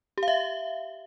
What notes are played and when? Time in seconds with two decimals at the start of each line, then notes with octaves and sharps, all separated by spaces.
0.18 G4
0.23 F5
0.28 E5